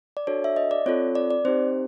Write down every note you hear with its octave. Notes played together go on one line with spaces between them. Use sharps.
D5
D4 F#4 A4 C#5
E5
D#5
D5
C4 F4 A4 C#5
D5
D5
C4 D#4 G4 C5